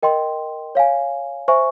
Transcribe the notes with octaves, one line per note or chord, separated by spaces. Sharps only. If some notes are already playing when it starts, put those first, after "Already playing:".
A#4 D#5 G5 C6
C#5 F5 G#5
C5 E5 G#5 C#6